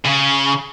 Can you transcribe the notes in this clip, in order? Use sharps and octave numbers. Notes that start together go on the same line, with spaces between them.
C#3